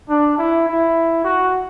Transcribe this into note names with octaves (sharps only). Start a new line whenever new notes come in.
D4
E4
E4
F#4